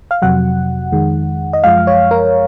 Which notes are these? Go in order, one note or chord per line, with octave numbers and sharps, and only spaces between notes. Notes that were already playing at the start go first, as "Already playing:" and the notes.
F5
F2 C3 F#3 F#5
F2 D#3 G#3
D#5
F#2 F3 G#3 F5
C#5
A#4